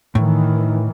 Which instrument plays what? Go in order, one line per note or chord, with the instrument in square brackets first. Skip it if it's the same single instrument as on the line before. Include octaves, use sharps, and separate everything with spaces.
[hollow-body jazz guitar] A2 [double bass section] D#3 E3